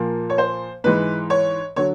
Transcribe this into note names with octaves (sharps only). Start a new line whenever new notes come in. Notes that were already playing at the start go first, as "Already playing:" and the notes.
Already playing: A#2 F3 A#3
C#5
C5
G#2 E3 G#3 B4
C#5
D3 F#3 C#5